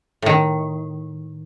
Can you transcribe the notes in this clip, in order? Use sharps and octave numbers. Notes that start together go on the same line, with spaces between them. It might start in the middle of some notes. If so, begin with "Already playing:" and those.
A2 D#3